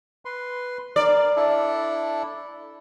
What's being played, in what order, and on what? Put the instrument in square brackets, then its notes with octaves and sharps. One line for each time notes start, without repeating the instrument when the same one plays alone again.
[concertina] B4 C6
[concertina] A#4 [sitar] D5
[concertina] D4 E4 A4